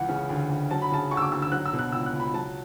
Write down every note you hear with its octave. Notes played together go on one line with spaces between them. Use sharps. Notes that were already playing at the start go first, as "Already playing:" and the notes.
Already playing: C#2 E3 F#5
C#3
D2
D2
F#3 A5
B5
C#3 A5
D2 C#6
E6
D6
D2 E6
E6
F#3 F#6
E6
B2
F#6
C#2 E6
F#6
C#2
B5
F#3 A5